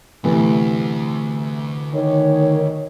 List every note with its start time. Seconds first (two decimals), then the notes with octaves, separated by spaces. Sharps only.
0.24 D2 A2 C3 E3
1.94 D#3 C#5